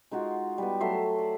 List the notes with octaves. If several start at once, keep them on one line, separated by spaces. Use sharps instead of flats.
G#3 D#4 F4 F#4
G3 B3
F#3 A3 E5 C6
D5